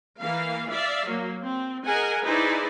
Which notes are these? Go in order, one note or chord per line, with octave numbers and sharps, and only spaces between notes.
E3 A#3 F5
D5 E5 F5
F#3 A#3
C4
G#4 A#4 D#5 F#5 G#5
D#4 E4 G#4 B4 C5 D5